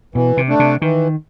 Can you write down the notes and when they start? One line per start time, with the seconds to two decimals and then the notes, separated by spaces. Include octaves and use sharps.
0.15 B2 E3
0.37 C3
0.49 A3 D4
0.60 C3
0.81 D#3 E3